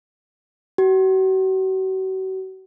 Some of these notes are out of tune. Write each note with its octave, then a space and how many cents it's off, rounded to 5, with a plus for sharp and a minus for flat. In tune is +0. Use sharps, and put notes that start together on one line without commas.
F#4 +40